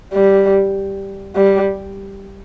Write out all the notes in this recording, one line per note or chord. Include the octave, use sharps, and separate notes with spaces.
G3
G3